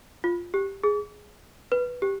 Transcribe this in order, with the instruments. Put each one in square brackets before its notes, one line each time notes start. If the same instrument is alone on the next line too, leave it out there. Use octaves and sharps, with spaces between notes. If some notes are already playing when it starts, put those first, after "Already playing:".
[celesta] F4
G4
G#4
B4
G4